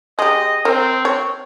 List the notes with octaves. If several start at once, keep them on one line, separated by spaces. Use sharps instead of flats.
G#3 G4 D#5
C4 A#4
C#5